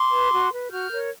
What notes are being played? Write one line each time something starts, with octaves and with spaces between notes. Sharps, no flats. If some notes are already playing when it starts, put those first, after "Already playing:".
Already playing: C6 D6
B4
F#4
B4
F#4 F6 G6
A#4 C#5